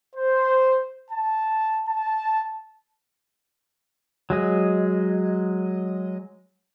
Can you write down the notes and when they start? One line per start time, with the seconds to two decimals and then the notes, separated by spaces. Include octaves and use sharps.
0.15 C5
1.11 A5
1.87 A5
4.30 F#3 G#3 D#5